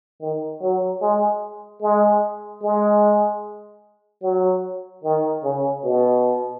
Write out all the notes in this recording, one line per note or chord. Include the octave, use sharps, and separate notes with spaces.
D#3
F#3
G#3
G#3
G#3
F#3
D#3
C#3
B2